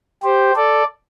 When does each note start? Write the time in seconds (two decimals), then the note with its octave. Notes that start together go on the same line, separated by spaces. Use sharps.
0.23 G4 C5
0.56 A4 D5